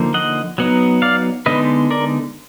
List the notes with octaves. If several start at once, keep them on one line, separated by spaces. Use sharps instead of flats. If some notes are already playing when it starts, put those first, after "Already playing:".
Already playing: D3 F3 A#3 D#4
D#5 F#5
F#3 B3 D#4
D5 F5
D3 G#3 B3 D#4 B4 D#5
A#4 D5